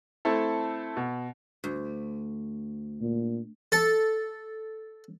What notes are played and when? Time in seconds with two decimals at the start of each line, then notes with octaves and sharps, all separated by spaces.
0.25 A3 C4 E4 A4
0.96 B2
1.64 D2
3.01 A#2
3.72 A4